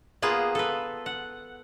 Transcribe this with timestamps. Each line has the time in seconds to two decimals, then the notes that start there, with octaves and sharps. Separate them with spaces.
0.22 A#3 B3 F4 G#4
0.55 A4 B4
1.06 F#5